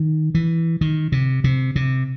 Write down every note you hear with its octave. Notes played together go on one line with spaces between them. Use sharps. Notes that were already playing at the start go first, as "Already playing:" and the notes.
Already playing: D#3
E3
D#3
C3
C3
C3